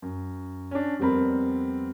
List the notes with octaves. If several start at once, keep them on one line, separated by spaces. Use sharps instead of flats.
F#2
C#4 D4
F2 G3 B3 C4 A#4 B5